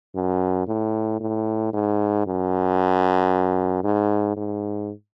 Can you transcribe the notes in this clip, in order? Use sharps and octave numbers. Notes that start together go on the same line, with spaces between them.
F#2
A2
A2
G#2
F#2
G#2
G#2